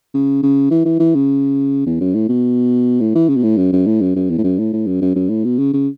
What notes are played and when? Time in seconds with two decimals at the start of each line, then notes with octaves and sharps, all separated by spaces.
0.14 C#3
0.43 C#3
0.71 E3
0.85 E3
0.99 E3
1.15 C#3
1.86 E2
2.01 F#2
2.14 A2
2.29 B2
3.00 A2
3.15 E3
3.29 C#3
3.36 B2
3.43 A2
3.57 F#2
3.72 F#2
3.86 A2
4.01 F#2
4.15 F#2
4.30 E2
4.38 A2
4.44 F#2
4.59 A2
4.73 A2
4.87 F#2
5.02 F#2
5.16 F#2
5.29 A2
5.44 B2
5.58 C#3
5.73 C#3